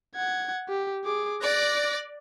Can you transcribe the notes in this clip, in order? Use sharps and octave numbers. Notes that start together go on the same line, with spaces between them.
F#5 G#6
G4
G#4 D6
D5 F#6 A#6